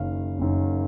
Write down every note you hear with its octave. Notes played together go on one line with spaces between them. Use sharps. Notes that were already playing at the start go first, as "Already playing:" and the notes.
Already playing: F#1 F#2 D#3 F5
F#1 F#2 D#3